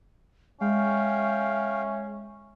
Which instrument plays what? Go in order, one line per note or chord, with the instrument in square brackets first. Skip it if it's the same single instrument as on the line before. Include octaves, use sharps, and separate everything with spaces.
[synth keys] G#3 [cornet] C#4 [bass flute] E5 [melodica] F5 G5